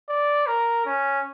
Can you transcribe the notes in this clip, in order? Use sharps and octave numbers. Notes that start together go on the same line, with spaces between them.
D5
A#4
C#4